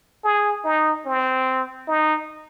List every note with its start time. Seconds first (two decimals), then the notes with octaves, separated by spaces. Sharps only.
0.24 G#4
0.64 D#4
1.06 C4
1.88 D#4